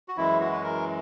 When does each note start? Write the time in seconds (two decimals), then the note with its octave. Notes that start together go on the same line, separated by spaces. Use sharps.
0.08 F#4
0.16 F#2 E3 G#3 E4
0.40 F#4
0.53 B4
0.63 A#4